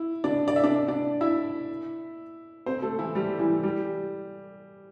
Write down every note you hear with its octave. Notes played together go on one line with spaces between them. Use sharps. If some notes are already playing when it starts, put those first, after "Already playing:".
Already playing: E4
D4 D5
D5
E5
D4 D5
D4 D5
E4 E5
C4 C5
A3 A4
E3 E4
G3 G4
E3 E4
G3 G4